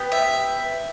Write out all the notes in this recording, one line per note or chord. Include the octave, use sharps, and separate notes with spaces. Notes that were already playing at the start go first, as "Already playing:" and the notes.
Already playing: B3 G4
E5